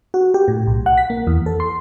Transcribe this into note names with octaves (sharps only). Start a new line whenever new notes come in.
F#4
G4
A2
B1
F#5
B6
A#3
E2
A4
C6